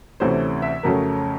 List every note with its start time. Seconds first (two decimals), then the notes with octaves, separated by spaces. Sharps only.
0.20 D2 C3 E3 A3 C#4 C5
0.62 E5
0.83 F2 C#3 F#3 A3 C#4 A#4